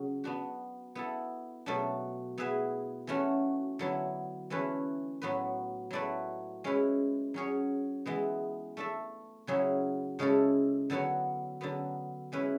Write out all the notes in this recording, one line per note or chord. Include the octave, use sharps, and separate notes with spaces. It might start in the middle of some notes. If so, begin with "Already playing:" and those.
Already playing: C#3 F#3 C#4
B3 D4 F#4
B3 E4 A4
B2 F#3 A3 D4
B3 E4 G#4 B4 E5
E3 A3 C#4 F#4
D3 F#3 B3 E4
E3 A3 C#4 E4 B4
A2 F#3 B3 F#4 B4
F#3 A3 E4 B4 D5
G#3 C#4 E4 B4
F#3 C#4 G#4 C#5
E3 G#3 B3
A3 D4 A4 E5
C#3 F#3 C#4 E4 G#4
C#3 G#3 C#4 E4 A4
D3 F#3 B3 F#4 C#5
D3 F#3 B3
G#3 C#4 E4 B4